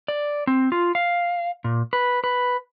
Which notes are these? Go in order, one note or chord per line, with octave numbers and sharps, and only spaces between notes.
D5
C4
F4
F5
A#2
B4
B4